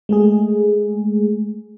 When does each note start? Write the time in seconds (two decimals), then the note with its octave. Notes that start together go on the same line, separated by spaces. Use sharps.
0.09 G#3 A3 G#4